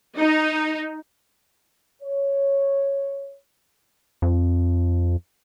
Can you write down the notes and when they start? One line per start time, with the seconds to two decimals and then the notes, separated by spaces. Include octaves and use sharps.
0.17 D#4
2.03 C#5
4.22 F2